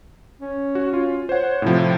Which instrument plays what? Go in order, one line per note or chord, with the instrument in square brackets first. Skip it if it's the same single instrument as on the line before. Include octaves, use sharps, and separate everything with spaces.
[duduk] C#4
[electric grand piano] F#4
F4
[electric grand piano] C5 F#5 [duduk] C#5
[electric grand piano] A2 C3 F3 [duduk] E4